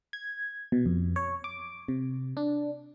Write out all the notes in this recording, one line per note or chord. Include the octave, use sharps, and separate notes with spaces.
G#6
B2
F2
C#5
D6
C3
D4